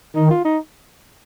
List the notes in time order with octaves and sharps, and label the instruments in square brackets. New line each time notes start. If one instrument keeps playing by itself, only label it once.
[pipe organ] D#3 [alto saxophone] D#4
[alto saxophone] F4
D#4